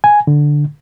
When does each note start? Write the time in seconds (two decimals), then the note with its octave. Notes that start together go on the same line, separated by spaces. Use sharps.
0.04 G#5
0.27 D3